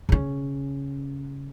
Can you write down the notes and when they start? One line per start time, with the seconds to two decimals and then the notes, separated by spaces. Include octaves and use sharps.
0.09 C#3 C#4